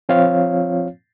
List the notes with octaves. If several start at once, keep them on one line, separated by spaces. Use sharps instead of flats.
F3 C4 F4 C#5 F5